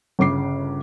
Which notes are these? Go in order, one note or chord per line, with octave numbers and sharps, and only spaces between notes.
G1 C#3 D6 C7